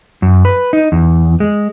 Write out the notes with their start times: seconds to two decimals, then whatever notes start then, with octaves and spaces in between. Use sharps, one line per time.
0.22 F#2
0.45 B4
0.73 D#4
0.92 E2
1.40 G#3